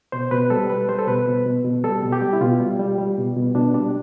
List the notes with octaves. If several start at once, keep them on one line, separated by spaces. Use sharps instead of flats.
B2 C5
B2 B4
G3 A4
G3 B4
G3 C5
A4
B2 B4
B2
B2
B2
G3 A4
B2
G4
G3
E4
B2 F4
G3
G3
G3
B2
B2
B2 D4
G3 D4